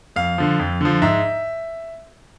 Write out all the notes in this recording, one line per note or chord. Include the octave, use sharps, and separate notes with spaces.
F2 F5
D3 F3
F2
D3 F3
G#2 E5